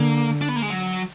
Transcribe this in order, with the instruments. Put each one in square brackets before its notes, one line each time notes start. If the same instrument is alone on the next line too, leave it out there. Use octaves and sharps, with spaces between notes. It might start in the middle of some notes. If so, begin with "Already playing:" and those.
Already playing: [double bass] D3 [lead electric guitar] A#3
[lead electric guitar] D4
B3
A#3
G#3
F#3